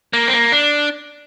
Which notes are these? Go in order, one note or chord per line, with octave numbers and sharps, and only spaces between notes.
A#3
C4
A#3
D4